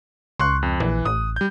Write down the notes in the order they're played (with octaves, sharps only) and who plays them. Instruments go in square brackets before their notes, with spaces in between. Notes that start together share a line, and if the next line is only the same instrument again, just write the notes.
[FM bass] C#2 [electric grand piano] C6 C#6 F#6
[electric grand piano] F2
[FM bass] A#1 [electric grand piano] E3
[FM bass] A1 [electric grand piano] D#6
[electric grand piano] G3 G6